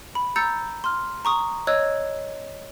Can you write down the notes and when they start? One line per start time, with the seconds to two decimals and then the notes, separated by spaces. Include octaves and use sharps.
0.15 B5
0.36 A#5 E6 G6 A6 C#7
0.84 C6 F6
1.25 A#5 C#6 D#6
1.67 C#5 D#5 E6 F#6 G#6